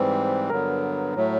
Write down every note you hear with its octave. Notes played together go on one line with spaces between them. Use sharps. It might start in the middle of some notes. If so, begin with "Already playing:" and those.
Already playing: G#2 E3 G3 C4 B4
G2 D3 F#3 B3 A#4
A2 F#3 A3